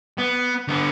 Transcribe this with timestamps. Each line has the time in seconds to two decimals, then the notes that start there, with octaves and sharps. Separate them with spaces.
0.19 B3
0.68 D3 B3